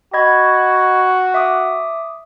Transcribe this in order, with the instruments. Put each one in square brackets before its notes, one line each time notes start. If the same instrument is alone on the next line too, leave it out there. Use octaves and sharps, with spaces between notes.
[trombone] F#4 [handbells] D#5 B5 G#6
[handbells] E5 D6 D#6